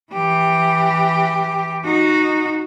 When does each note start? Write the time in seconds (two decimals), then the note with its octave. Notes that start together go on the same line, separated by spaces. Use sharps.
0.12 E3 G4
1.84 D#4 F#4